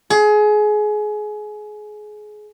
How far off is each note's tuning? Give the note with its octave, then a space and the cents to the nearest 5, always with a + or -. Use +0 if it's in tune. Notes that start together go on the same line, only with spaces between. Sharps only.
G#4 +25